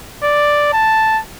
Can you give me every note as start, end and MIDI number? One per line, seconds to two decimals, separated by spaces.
0.23 0.69 74
0.73 1.20 81